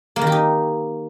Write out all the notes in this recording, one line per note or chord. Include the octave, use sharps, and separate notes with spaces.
A#3
D#3
G4
D#4